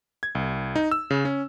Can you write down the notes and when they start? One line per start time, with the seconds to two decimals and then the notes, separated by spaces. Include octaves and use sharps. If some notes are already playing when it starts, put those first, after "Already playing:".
0.23 G#6
0.35 C2
0.76 D#4
0.91 E6
1.10 C#3
1.25 C#4